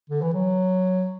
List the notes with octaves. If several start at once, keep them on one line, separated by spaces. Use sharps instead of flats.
D3
E3
F#3